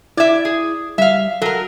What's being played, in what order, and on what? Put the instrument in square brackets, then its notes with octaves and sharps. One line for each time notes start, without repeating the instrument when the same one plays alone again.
[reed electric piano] E4 G#6 [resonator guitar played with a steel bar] D5 E5
[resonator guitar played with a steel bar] G#4
[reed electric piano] G3 [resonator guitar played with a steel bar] E5 F5
[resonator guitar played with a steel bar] F#3 A#4 [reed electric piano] A4